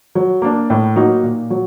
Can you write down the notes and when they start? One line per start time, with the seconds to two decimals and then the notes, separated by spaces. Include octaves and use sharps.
0.15 F#3
0.42 A#3 D4
0.70 A2
0.96 F#3 A#3 D#4 F#4
1.23 A#2
1.50 F#3